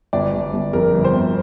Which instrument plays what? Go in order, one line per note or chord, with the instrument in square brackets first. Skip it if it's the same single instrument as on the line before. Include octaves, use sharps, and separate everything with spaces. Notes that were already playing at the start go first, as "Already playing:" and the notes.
[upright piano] G1 D5
G1
G1
F2 A#4
G1
C5
G1